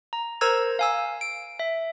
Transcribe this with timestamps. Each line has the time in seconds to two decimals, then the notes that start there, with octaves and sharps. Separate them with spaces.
0.13 A#5
0.41 A#4 C5 A#5 E6 G#6
0.79 F5 G#5 E6
1.21 D7
1.59 E5